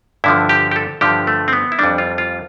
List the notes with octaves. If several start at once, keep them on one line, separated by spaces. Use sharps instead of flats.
G2 D3 F3 E4
G4
G4
A4
G2 D3 F3 G4
A3
C4
B3
E4
F2 E3 G3 D4
F4
F4